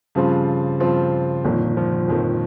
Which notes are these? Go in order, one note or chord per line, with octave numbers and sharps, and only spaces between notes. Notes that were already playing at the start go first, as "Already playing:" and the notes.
G2 C#3 F3 C4 F4
G2 F3 C4 F4
G1 F2 A#2 D#3
F3
G1 F2 D#3